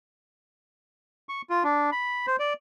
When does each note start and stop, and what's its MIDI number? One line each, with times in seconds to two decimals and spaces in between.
1.29 1.42 85
1.50 1.63 65
1.64 1.90 62
1.92 2.26 83
2.27 2.36 72
2.39 2.53 74